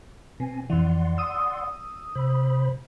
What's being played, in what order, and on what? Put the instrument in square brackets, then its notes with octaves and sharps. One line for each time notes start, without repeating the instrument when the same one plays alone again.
[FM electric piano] B2 [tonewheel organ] C4 G#5
[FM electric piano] F2 E3 [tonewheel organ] D5 F#5 C6
[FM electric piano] D#6 E6
[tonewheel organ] C3 C5 B5